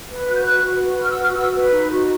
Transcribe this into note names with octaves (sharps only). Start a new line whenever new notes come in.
B4
F#4 F#6
G6
B4 F#6
F#4
B4
F#4 F6
E6
B4
F6
F#4 E6
B4
D#4
F#4